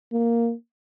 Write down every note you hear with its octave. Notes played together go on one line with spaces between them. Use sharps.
A#3